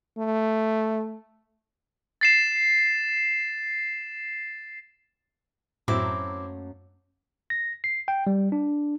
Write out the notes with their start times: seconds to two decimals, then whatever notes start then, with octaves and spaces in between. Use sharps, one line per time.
0.18 A3
2.21 A6 C7 E7
5.88 F#2 A2 F#3 A3 A#3 C4 E4 D6
7.50 A#6
7.84 C7
8.08 G5
8.27 G3
8.52 D4